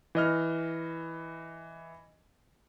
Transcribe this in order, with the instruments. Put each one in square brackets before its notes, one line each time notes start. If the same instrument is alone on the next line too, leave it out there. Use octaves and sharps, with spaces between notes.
[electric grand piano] E3 D#5 F6